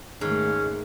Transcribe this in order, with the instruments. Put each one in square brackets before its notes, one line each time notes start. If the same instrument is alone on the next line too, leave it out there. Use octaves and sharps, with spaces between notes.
[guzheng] G#2 [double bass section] D#3 A3 A#3 [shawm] C#4